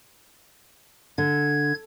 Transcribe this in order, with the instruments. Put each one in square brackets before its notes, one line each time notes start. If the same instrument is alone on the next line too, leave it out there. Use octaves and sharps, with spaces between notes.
[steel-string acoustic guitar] D3 [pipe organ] G#6